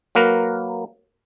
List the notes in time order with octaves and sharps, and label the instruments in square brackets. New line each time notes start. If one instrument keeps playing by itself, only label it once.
[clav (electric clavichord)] F#3 A#3 A#4 B4